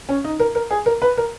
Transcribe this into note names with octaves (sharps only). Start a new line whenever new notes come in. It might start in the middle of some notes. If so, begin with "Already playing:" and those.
C#4
D#4
A#4
A#4
G#4
A#4
B4
A#4